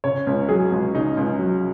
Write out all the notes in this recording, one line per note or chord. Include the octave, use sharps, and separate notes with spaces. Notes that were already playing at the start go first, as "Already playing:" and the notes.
C#3 C#5
C#2
F#3 G#4
C#2
C#3 D#4
C#2
F#3